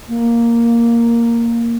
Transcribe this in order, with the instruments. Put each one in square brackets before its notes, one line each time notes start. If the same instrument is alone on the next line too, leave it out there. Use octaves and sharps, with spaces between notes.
[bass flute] A#3